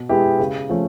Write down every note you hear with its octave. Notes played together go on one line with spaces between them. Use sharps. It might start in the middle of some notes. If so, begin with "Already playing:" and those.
Already playing: B2
G#3 B3 E4 G4
C#3
F3 A3 C#4